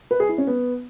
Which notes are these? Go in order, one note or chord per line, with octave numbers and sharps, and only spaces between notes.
B4
G#4
E4
C#4
B3